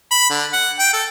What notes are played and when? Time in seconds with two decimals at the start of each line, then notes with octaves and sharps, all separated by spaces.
0.11 B5
0.30 D3
0.53 F#5
0.79 G5
0.93 A4